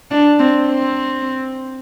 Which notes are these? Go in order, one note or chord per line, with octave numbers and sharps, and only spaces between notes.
D4
C4
C4